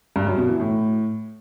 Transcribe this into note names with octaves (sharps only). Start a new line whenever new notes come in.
G2
F#2
B2
E3
A2